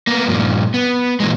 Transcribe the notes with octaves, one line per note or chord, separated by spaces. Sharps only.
A#3 B3
G2 A#2 F3
B3
A#2 E3 G#3